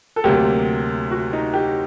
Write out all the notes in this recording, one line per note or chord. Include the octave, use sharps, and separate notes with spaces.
A4
D2 C3 F#3 A#3 G4
F#4
D#4
G4